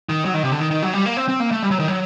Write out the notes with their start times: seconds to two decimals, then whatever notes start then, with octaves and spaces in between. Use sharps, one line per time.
0.09 D#3
0.25 F#3
0.34 D#3
0.43 C3
0.52 D3
0.60 D#3
0.71 D#3
0.83 F#3
0.94 G3
1.05 A#3
1.17 C4
1.28 C4
1.40 A#3
1.51 A3
1.63 G3
1.71 F#3
1.79 D#3
1.88 F#3